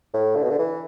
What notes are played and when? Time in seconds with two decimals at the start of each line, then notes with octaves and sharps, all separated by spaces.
0.14 A2
0.36 D3
0.43 B2
0.50 D3
0.59 E3